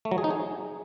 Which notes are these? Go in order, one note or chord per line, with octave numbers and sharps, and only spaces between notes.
A3
F#3
G#4
D#4
G#4